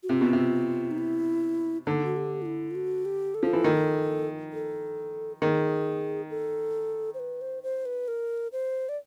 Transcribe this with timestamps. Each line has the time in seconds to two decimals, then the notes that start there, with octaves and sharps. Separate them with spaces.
0.03 F#4
0.09 C3 F4
0.21 B2
0.33 C3
0.91 D#4
0.98 E4
1.86 D3 D#4
2.04 F#4
2.16 G4
2.42 F4
2.46 E4
2.71 F4
2.75 F#4
3.05 G4
3.35 A4
3.43 F3
3.53 E3
3.64 D#3
4.53 A4
5.42 D#3 G#4
6.30 A4
7.14 C5
7.19 B4
7.41 C5
7.63 C5
7.86 B4
8.08 A#4
8.52 C5
8.89 D5